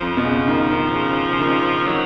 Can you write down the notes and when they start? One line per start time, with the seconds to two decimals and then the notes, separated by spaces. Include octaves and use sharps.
0.01 F2 F3
0.17 B2
0.24 C#3
0.48 D#3
0.71 D#3
0.94 C#3
1.32 C#3
1.40 D#3
1.87 D#3 F#3